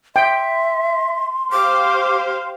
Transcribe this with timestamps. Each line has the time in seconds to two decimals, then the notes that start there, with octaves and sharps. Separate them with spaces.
0.16 E5 G5 C6
1.52 G4 C5 F5 D6